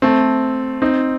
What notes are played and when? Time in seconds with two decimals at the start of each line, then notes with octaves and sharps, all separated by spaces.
0.02 A3 C4
0.82 C4 D#4